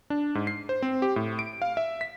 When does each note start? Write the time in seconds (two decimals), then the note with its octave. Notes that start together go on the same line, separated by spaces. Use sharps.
0.10 D4
0.35 G#2
0.47 C7
0.69 C5
0.82 C4
1.02 G4
1.16 A2
1.39 D7
1.62 F5
1.77 E5
2.01 B6